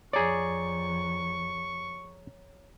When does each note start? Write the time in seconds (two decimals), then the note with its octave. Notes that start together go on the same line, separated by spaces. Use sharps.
0.13 F2 G#4 C#5 D5 A#5 C#6